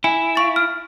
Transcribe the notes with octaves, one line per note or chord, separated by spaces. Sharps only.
E4 G#5
F5 C#6 A6
F6